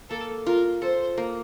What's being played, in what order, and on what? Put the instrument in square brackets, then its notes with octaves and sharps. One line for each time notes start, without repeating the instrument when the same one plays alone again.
[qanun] A#3 [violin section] A4
[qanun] F4 [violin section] A#4
[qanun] A4 [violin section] C5
[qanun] A#3